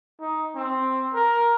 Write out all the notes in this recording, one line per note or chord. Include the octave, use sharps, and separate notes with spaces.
D#4
C4
A#4